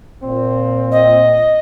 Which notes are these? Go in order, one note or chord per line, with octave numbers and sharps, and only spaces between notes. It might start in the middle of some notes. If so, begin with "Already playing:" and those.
A#2 C4
D#5